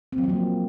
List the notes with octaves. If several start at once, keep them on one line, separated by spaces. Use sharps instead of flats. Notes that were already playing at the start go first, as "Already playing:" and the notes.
C4
F#3
F3
A#3